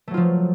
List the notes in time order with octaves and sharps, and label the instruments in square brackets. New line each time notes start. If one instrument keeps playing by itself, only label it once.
[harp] A3
F#3
F4
F3